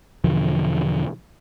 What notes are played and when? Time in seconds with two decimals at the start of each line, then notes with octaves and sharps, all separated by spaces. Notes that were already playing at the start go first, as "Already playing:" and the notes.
0.24 E2 B2 D3 F3